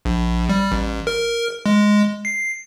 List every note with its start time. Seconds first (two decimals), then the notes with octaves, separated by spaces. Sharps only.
0.05 A#1
0.49 G3
0.72 A1
1.07 A#4
1.66 G#3
2.25 C7